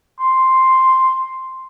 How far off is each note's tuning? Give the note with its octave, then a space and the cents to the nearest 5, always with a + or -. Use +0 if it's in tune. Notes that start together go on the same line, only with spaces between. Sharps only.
C6 +0